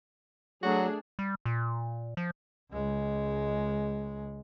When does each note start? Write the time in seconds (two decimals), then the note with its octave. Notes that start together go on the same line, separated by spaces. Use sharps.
0.63 F#3 A3 D4 F#4 G#4
1.19 G3
1.45 A#2
2.17 F3
2.72 C#2 G#3